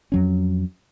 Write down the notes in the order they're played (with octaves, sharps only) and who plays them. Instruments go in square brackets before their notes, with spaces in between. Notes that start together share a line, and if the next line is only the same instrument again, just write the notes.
[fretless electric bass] F2 F#3 C#4